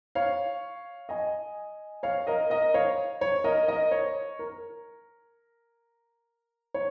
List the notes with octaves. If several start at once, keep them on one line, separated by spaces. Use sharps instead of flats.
C#5 F5
D#5 G#5
C#5 F5
A#4 D#5
A#4 D#5
C#5 F5
C#5
A#4 D#5
A#4 D#5
C#5
A#4
C#5